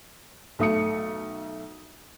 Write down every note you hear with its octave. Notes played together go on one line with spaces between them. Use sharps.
B1 A3 D#6 C#7